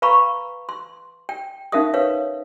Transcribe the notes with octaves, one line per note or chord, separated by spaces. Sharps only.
B4 F5 A#5 B5 C#6
C6
G5
C#4 D#4 A#4 E5 F5 D#6
B4 C#5 F5